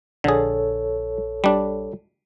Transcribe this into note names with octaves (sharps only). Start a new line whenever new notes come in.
A#1 D3 G#4 A4 C#5
G3 D4